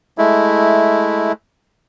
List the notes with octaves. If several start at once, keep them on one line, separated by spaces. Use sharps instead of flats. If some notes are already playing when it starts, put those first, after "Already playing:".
G#3 A3 E4